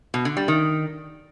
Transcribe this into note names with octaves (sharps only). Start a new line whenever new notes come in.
B2
D3
G3
D#3